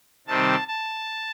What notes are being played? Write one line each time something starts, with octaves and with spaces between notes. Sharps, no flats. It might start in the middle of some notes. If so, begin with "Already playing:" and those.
C3 D#3 G3 C4 A5
A5